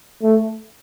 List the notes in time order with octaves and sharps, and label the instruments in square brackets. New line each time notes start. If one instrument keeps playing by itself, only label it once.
[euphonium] A3